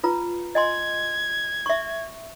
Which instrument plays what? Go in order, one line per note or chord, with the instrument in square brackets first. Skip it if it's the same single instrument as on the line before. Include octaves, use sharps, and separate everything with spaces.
[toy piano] F4 B4 A#5
[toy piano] D#5 G#5 C6 [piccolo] G#6
[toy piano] E5 C#6